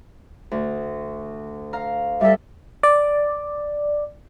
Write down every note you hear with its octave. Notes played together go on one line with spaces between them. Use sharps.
D2
F5 A#5
G3 A4 E5
D5